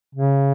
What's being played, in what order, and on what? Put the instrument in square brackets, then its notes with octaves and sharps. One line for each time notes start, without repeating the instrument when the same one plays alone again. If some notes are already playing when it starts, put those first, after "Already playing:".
[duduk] C#3